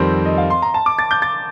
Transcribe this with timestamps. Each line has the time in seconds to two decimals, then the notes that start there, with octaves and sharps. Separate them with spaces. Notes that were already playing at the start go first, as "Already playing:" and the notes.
Already playing: F2 D#3 G3 C4
0.25 D#5
0.37 F5
0.50 C6
0.62 A#5
0.74 A5
0.86 D6
0.99 A6
1.11 G6
1.22 A6